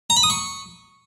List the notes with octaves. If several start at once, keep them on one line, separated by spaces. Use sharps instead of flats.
A#5
B5
D#6
C#6